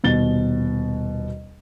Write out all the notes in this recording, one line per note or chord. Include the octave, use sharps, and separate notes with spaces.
D#1 B2 A6 G7